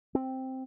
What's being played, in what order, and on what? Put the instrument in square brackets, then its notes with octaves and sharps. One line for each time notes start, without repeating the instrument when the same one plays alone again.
[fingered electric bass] C4